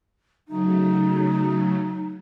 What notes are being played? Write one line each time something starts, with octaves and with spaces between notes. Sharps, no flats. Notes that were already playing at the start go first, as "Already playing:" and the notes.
C#3 F#3 A3 D#4